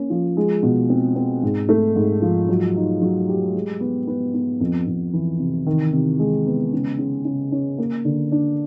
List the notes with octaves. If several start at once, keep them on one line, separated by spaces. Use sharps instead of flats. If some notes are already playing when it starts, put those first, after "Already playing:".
Already playing: A#3 C#4
F3
G#3
B2
C4
C4
G#2
A3
G#2
F3
F#3
D#4
F#3
G4
G#3
B3
B3
B3
F2
F2
E3
C3
D#3
C3
G#3
B3
C#3
C#3
C#3
C#4
A#3
D3
D4